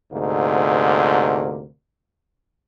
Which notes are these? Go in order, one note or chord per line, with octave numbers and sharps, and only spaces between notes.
D2 G#2 C3 A#3